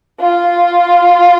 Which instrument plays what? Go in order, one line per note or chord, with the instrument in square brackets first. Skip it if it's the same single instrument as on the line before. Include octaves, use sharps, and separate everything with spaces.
[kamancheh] F4